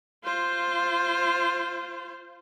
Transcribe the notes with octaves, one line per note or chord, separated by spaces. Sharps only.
F4 C5